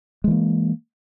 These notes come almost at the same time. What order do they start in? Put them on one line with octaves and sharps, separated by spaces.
G#3 E3 A#3